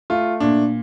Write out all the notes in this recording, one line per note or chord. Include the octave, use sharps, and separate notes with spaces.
A3 F4
A#2 D4